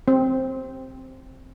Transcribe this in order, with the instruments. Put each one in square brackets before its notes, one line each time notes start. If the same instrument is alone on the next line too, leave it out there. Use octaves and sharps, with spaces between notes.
[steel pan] C4